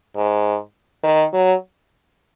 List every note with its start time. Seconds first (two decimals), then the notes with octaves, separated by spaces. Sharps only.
0.16 G#2
1.04 D#3
1.33 F#3